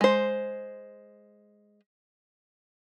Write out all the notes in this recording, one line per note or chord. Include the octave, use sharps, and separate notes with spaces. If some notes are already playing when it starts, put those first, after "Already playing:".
G#3 C5